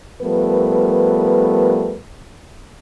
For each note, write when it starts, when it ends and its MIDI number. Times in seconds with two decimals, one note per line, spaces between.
0.22 1.99 53
0.22 1.99 55
0.22 1.99 57
0.22 1.99 59
0.22 1.99 70
0.22 1.99 71